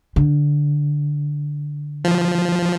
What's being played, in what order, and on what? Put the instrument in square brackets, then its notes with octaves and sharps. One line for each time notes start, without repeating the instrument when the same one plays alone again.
[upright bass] D3
[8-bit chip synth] F3